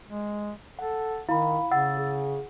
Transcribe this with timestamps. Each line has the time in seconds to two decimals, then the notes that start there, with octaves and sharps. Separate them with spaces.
0.09 G#3
0.79 A4 F#5
1.29 D#3 E4 F5 B5
1.71 C#3 F#5 E6 A6
1.97 G#4